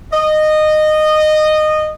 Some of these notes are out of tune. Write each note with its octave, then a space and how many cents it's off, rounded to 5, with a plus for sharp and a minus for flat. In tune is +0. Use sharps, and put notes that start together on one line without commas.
D#5 -15